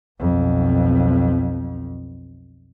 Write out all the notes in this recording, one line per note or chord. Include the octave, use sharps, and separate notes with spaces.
B1 F2